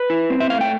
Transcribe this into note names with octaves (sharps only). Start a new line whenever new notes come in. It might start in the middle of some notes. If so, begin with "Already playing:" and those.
Already playing: B4
E4
C4
E5
A3 F5
G5